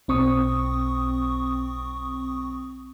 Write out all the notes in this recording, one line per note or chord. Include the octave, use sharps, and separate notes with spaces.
B1 C4 C#6 D#6